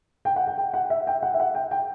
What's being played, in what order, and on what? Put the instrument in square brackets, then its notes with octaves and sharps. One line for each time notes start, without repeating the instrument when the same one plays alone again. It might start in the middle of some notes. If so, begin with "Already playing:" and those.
[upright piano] G5
F#5
G5
G5
F#5
E5
G5
F#5
E5
F#5
G5
G5